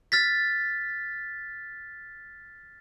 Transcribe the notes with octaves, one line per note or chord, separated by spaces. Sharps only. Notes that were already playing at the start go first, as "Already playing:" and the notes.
F6 A6 B6